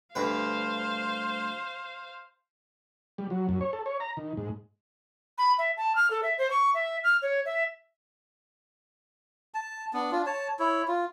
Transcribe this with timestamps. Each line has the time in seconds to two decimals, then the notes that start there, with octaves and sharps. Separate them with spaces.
0.15 D2 G2 B4 C5 F5
3.18 G3
3.30 F#3
3.49 F#2
3.61 C#5
3.73 A4
3.86 C#5
4.00 A#5
4.17 D#3
4.37 G#2
5.38 B5
5.58 E5
5.77 A5
5.96 F6
6.11 A4
6.23 E5
6.38 C5
6.51 C#6
6.75 E5
7.04 F6
7.22 C#5
7.46 E5
9.54 A5
9.94 B3 D4
10.12 D4 F4
10.26 C#5 A5
10.59 E4 C#5
10.88 F4